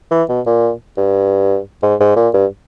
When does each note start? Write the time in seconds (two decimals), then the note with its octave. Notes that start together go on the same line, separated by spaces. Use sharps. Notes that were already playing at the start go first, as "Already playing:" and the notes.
0.11 E3
0.29 B2
0.46 A#2
0.97 G2
1.83 G#2
2.00 G#2
2.16 A#2
2.34 G2